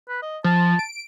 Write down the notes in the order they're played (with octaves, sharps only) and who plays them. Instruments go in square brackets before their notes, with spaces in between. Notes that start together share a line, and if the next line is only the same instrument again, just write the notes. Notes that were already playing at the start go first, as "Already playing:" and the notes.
[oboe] B4
D#5
[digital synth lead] F3 [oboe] A5
[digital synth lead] D7